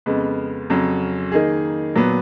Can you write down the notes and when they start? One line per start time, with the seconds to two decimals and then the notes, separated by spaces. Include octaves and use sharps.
0.06 F2 C#3 G#3 B3
0.70 F2 C#3 F#3 C#4
1.32 D#3 A#3 D#4 G#4
1.96 A#2 F#3 B3